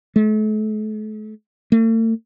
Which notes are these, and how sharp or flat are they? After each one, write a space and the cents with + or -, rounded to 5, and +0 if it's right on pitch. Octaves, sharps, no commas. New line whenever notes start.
A3 -40
A3 +45